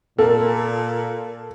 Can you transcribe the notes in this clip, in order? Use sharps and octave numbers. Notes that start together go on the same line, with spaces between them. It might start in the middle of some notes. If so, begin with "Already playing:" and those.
A#2 A#3 A4 A#4